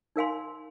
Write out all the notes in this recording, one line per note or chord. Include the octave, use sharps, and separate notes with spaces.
D#4 A#4 F5 G#5 C6